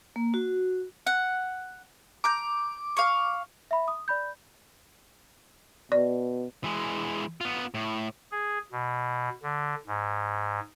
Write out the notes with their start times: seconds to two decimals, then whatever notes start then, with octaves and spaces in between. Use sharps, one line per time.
0.16 A#3
0.34 F#4
1.07 F#5
2.24 A#5 D6 G6
2.97 F5 C#6
3.71 E5 B5
3.88 D#6
4.08 D5 B5 G6
5.92 B2 D5
6.64 E3 G#3
7.41 B3 F4
7.74 A2
8.32 G#4
8.72 B2
9.43 D3
9.87 G#2